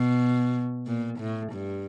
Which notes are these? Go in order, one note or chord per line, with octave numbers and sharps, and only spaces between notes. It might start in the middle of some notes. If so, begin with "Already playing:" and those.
Already playing: B2
A#2
A2
G2